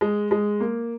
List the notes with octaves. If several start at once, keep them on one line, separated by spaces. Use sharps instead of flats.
G#3
G#3
A#3